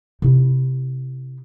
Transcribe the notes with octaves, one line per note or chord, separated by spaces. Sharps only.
C3 E4